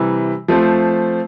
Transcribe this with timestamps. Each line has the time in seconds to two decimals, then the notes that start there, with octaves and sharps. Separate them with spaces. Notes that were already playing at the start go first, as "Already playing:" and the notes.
Already playing: C3 E3 G3
0.48 F3 A3 C4